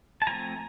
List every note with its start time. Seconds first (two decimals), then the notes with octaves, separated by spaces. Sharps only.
0.22 A5
0.27 F3 A3 C4 G#5 A#5